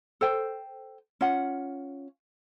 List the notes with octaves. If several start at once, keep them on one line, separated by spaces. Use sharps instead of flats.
A4 C5 G5
C#4 F4 F#5